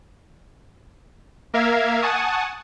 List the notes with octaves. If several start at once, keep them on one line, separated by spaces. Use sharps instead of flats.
A#3 A#4 E5 F5 G#6
F#5 G#5 A5 C#6 D#6